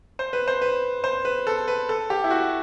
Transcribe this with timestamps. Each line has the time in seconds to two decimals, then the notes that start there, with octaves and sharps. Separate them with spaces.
0.19 C5
0.33 B4
0.48 C5
0.62 B4
1.04 C5
1.25 B4
1.47 A4
1.68 B4
1.89 A4
2.10 G4
2.24 E4
2.31 F#4